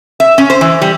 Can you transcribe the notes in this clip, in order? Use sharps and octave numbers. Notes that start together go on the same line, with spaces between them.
E5
C#4
C5
E3
G3